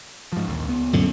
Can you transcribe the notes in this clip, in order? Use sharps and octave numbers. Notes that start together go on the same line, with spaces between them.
G#2 F3
A#1 D#2
C#2 B3
F#2 A#2 D3